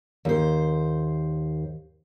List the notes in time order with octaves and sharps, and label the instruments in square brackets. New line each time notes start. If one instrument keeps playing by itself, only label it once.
[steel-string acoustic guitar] D#2 C5